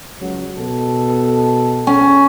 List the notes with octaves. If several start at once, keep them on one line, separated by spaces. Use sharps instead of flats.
C#2 F#3
B2 A4
C#4